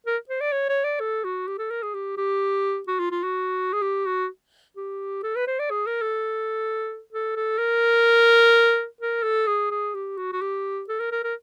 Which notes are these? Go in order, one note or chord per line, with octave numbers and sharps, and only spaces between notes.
A#4
C5
D5
C#5
C#5
D5
A4
F#4
G4
A4
A#4
G#4
G4
G4
F#4
F4
F4
F#4
G#4
G4
F#4
G4
A4
B4
C5
D5
G#4
A#4
A4
A4
A4
A#4
A#4
A4
G#4
G#4
G4
F#4
F#4
G4
A4
A#4
A#4
A#4